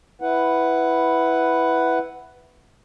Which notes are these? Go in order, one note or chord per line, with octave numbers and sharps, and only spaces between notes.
E4 B4 F#5